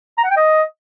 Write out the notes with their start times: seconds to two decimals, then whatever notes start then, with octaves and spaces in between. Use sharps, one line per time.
0.18 A#5
0.24 F#5
0.30 G5
0.36 D#5